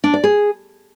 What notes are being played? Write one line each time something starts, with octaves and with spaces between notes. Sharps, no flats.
D4
D5
G#4